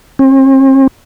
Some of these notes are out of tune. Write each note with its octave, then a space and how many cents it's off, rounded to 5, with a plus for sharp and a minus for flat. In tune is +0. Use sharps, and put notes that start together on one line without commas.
C4 +45